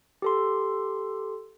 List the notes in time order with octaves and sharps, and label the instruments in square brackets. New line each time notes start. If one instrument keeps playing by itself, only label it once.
[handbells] G4 A4 C6